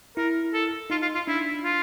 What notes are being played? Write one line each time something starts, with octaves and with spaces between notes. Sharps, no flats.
E4 A#4
A4
D#4 F4
F4
F4
D4 E4
F4